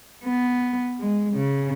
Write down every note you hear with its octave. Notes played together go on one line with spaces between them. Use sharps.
B3
G#3
C#3